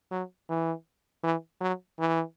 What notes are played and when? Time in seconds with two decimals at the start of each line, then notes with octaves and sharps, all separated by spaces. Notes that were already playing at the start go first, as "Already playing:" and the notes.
0.11 F#3
0.49 E3
1.23 E3
1.61 F#3
1.99 E3